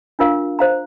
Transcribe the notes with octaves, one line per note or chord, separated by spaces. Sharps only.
D4 F4 A#4 F5
C5 F5 A#5